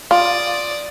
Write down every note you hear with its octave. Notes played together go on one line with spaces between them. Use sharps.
F4 D5 D#6